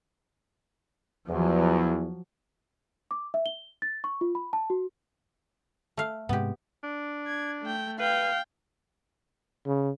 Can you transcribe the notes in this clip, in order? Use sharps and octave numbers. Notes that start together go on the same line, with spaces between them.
E2 F3 F#3
D6
E5
G7
A6
C#6
F4
B5
A5
F#4
A3 F5
G#2 C3 G#3 B3 G4
D4
G#6
A3 G5
B4 F5 G5
C#3